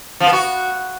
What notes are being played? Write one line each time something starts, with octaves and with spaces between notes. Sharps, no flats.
F3
B3
F#4